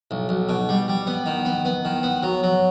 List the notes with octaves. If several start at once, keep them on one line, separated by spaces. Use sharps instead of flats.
B1
B1
B2
G3
G3
B3
D#3
B3
B3
D#3
B3
F#3
F#3